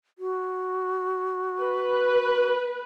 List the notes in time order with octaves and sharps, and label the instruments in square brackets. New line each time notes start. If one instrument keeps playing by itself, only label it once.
[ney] F#4
[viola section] B4